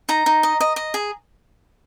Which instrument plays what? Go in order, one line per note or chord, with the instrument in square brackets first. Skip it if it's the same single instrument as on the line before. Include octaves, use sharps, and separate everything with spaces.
[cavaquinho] D#4 A#5
D#4
D#5
D#5
D#5
G#4